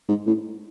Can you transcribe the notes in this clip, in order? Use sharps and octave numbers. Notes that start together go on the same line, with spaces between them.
G#2
A2